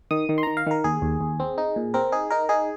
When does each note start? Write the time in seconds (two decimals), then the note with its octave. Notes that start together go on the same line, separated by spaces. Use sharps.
0.11 D#3 D#6
0.29 D#3
0.38 C6
0.43 D#3 A#5
0.57 F5
0.67 D#3 A#4
0.84 D#2 G#4
1.02 D#2
1.21 D#2
1.40 C4
1.58 D#4
1.76 A#2
1.94 C4 A#4
2.12 D#4 G#4
2.30 D#4 A#4
2.49 D#4 G#4